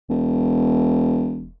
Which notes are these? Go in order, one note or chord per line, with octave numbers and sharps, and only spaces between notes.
E1